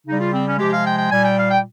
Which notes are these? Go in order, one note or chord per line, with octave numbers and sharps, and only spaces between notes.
C#3 G3 D#4
F4
C4
C#4
C3 F3 G#3 G4
F5
G5
G5
A#2 G3 G#5
G5
F5
G5